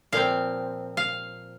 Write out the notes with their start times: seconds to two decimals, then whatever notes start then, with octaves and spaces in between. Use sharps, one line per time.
0.13 A#2 F3 C4 F5
0.97 F5